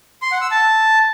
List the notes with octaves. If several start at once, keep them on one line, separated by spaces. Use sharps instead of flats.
C6
F#5
E6
A5